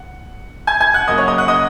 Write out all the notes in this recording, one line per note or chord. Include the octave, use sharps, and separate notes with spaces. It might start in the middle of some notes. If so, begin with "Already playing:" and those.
Already playing: F#5
G#5 G#6
G#5 G#6
F#5 F#6
F#2 C#3 A#3 D#5 D#6
C#5 C#6
D#5 D#6
F#5 F#6
D#5 D#6